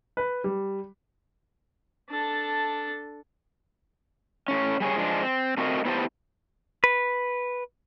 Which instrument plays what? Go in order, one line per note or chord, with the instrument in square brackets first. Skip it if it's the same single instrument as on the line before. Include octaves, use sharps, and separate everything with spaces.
[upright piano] B4
G3
[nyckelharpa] D4 A4
[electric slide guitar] A2 C#4
G3 G#4 C#5
F3 G#3 D4
C4
A3 C4 F4 F#4 A#4 D#5
B3 E4 G4 C5 E5 A5
[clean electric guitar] B4